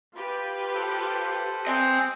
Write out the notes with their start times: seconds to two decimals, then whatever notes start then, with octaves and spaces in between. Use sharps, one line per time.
0.15 F4 G4 B4
0.74 A4 C5 F#6
1.67 C4 D#5 G#5